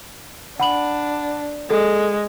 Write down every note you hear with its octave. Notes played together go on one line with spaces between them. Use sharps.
D4 F#5 B5 F#7
G#3 A4